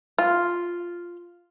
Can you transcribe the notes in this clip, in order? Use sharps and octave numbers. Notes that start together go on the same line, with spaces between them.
F4